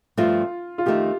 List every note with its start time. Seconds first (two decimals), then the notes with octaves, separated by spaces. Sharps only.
0.17 G2 F3 A3 C4 F4
0.78 F4
0.86 F2 D#3 A3 C4 D#4 G4